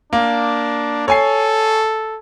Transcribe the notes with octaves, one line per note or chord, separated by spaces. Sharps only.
A#3 D4
A4 C#5 G#5 C7